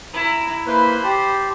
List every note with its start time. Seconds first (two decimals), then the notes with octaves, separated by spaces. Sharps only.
0.14 E4 A#5
0.67 A#3 E4 B4 C5 B5
1.04 G4 A5 C6